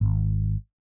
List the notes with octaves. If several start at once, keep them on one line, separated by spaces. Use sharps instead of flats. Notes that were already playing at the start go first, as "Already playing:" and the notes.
G#1